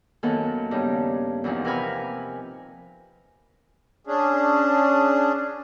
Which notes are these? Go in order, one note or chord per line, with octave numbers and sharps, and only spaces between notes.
F#2 D#3 A#3 B3 A4 F#5
G2 C#3 D#4 G4
E2 A#2 F3 C4 D#4
C3 A#4 B4 G#5 B5 F6
C#4 D4 G#4